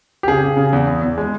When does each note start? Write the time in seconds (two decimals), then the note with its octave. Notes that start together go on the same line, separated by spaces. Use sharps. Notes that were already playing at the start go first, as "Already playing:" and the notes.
0.23 G4
0.28 C#3 G#4
0.43 C#3
0.57 C#3
0.73 E2
0.87 E2
1.02 E2
1.18 G#3